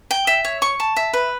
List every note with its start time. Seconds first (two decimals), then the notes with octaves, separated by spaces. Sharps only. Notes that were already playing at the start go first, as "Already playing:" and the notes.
0.11 G5
0.27 E5
0.45 C#5
0.62 C#6
0.80 A5
0.97 E5
1.13 B4